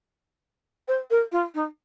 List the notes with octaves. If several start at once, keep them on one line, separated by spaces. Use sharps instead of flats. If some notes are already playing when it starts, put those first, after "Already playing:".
C5
A#4
F4
D#4